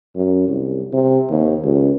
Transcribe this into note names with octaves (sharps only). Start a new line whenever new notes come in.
F#2
C2
C3
D#2
C#2